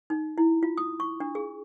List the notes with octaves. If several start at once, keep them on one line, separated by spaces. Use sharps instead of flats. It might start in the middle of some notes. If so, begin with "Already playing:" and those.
D#4
E4
F4
D#6
C#6
D4
G#4